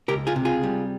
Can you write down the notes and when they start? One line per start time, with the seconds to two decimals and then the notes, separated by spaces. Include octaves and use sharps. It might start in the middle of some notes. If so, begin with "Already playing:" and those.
0.08 C#2 G4 A#4
0.27 F4 G#4
0.36 C3
0.45 F4 G#4
0.63 G3